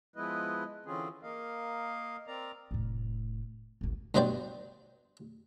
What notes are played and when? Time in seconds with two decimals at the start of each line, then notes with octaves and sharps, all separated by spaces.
0.16 F3 G#3 B3 E4 B4 D#5
0.86 D3 E3 C4 C#4 F4 G#4
1.23 A#3 A#4 D#5 F5
2.27 C4 A#4 D5 A#5
2.71 F1 A2
3.81 G#1 D2
4.15 G2 B2 F#3 C5 D5 G5